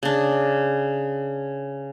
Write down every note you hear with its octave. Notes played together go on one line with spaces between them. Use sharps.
C#3 D4